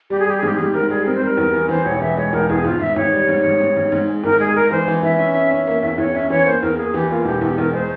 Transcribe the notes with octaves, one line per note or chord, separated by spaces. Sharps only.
G3 G4
G#4
G3 G4
G#4
G#2 G4
G#4
G#2 G4
G#2 A#4
G3 G#4
C4 A#4
C5
G3 A#4
E2
E3
E3 C5
E1 C#5
C#5
E3 E5
G#3 C#5
E1 A#4
E2 G#4
G#1 F4
G#2 E5
G#1 C#5
G3
G#2
G#2
G#2
G#2
G#2
G#3
G#1 A#4
G#3 G#4
G#3 A#4
E3 C5
E3
E3 E5
C#4
C#4
C#4
A#3
E2 E5
E2 C#5
C#4 E5
E3 C#5
A#3 C5
E2 A#4
A#3 G#4
E3 G4
A#3 F4
E1 G4
E2 G4
E2 A#4
G#3 C5